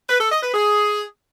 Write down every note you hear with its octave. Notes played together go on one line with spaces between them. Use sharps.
B4
A4
D#5
B4
G#4